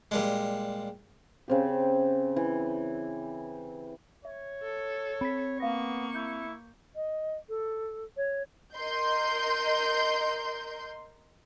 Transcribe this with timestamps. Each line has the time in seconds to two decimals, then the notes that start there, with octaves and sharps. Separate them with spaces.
0.11 A#2 G3 G#3
1.48 C#3 C4 G4
2.36 E3
4.25 C#5 E5
4.63 A4
5.21 C4 B5 B6
5.60 A#3 B3 F5 C#6 A#6
6.15 E4 G6
6.95 D#5
7.49 A4
8.17 C#5
8.76 A#4 D#5 C6 G6